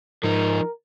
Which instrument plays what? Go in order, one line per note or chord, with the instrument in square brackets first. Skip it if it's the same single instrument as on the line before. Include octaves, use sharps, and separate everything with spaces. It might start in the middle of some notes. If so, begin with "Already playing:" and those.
[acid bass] G#2 [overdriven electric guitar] F3 D#4 [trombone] A#4